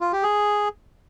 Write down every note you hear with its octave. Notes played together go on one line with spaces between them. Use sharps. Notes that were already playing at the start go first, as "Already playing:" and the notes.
F4
G4
G#4